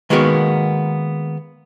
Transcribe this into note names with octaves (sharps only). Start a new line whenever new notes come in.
D#3 G#3 A#3 B3 F#4 A#4